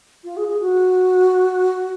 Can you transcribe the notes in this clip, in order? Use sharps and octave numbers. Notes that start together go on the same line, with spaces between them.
F4
G#4
G#4
F#4